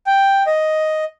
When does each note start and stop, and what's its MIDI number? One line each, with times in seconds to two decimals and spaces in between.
0.07 0.43 79
0.47 1.04 75